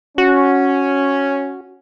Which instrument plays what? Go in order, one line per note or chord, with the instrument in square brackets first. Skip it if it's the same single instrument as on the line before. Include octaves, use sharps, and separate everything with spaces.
[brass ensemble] C#4 [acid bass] F#4